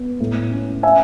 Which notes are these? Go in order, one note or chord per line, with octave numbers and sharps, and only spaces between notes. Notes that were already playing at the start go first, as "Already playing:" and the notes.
Already playing: B3
A2
C#4
E5 G#5